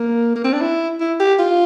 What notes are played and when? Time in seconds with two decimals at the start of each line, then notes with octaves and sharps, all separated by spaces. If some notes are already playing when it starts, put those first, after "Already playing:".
Already playing: A#3
0.36 A#3
0.44 C4
0.53 D4
0.61 E4
1.00 E4
1.20 G4
1.39 F4